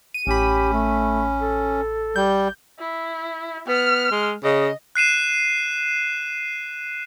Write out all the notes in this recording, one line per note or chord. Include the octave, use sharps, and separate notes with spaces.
D#7
A1 C#4 G4 B5
A3
A4
G3 G6
E4
B3 F6
G#3
C#3 D#5
F#6 C7 D#7 E7